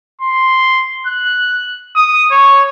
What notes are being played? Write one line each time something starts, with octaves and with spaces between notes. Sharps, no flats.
C6
F#6
D#6
C#5